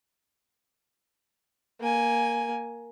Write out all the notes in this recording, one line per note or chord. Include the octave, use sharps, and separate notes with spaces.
A#3 G#5